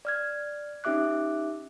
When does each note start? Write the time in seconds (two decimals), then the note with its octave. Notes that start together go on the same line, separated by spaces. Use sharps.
0.05 D5 F6 G#6
0.84 C#4 D#4 G4 E5 D6 F#6